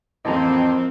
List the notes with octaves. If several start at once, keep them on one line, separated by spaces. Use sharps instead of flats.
A1 F2 F3 A#3 C4 D#5 A5 A#5